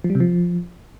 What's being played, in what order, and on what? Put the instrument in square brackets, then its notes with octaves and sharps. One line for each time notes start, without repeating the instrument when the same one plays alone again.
[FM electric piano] F3
G3
C3
F3